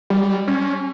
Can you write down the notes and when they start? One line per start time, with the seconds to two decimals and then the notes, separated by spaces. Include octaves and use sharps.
0.10 G3
0.47 C#4